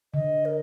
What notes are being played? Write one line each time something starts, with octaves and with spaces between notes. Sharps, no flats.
D3 D#5
A#4